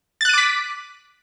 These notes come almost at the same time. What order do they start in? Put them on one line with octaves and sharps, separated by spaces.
A6 F#6 D#7 D6 B6